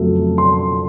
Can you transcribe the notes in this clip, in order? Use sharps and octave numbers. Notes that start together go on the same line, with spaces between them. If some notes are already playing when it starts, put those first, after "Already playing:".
Already playing: F2 C#3 F#3 A3
C6